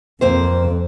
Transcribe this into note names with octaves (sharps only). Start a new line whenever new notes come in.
F2 A#3 C4 C5